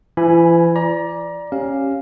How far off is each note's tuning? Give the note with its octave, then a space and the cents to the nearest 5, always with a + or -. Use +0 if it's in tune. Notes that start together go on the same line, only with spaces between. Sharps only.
E3 +40 G#5 +0 B5 +0
D5 +0 A#5 +30
C#4 -10 G4 +0 F5 +0